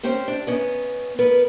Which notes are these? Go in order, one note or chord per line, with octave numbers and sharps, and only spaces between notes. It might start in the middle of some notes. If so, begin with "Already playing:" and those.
C4 C#4 G4 C5
D4
B3 C#4 D#4
B3 A#4 B4